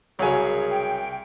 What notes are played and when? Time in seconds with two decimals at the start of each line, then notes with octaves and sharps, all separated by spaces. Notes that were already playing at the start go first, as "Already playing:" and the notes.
0.19 C2 C#3 F#3 G#4 A#4 G#5
0.69 G5